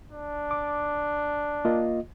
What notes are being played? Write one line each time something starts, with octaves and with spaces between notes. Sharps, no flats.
D4
D6
A#3 F4 D#5